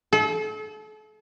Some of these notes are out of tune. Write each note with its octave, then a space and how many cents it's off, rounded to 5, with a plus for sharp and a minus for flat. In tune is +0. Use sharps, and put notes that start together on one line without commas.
A4 -40